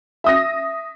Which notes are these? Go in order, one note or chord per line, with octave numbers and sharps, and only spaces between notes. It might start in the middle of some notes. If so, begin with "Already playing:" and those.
E5 D#6 A#6